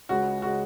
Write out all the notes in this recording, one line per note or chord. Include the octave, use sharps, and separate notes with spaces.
C#2 C#3 G#3 C#4 F#4
C#3 G#3 C#4 F#4